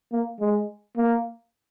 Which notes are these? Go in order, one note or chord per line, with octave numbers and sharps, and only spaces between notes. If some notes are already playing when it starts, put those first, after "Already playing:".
A#3
G#3
A#3